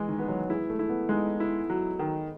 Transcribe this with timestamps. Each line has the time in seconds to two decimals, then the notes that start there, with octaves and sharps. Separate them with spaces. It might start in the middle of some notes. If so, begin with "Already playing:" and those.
Already playing: E3 G#3
0.08 D#3
0.19 B3
0.29 F#3
0.49 G#3 E4
0.70 A3
0.79 E4
0.89 B3
1.09 G#3 D#4
1.40 E4
1.70 F#3
1.99 D#3